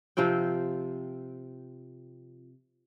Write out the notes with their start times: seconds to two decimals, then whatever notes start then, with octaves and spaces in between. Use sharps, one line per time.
0.17 C3 F3 C4 G5